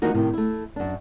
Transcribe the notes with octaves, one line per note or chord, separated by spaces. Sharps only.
E3 F3 A#3 D#4 F#4
A2 C3 D#3
A3 E4
F#2 D4